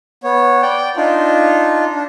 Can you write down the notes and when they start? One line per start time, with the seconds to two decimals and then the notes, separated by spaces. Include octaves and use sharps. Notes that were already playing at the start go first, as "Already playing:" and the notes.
0.24 B3 C#5
0.62 D5 G5
0.97 D4 D#4 F4
1.95 D4